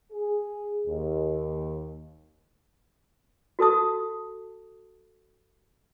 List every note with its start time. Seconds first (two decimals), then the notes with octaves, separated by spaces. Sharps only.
0.12 G#4
0.87 D#2
3.59 F#4 A4 A5 D#6